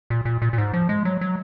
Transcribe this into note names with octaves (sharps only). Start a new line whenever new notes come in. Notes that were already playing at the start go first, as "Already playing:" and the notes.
A#2
A#2
A#2
A#2
G#2
F3
G#3
F#3
F#3